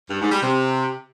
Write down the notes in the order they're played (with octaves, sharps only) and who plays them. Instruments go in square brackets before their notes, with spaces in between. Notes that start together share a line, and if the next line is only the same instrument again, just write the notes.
[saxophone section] G2
G#2
G3
C3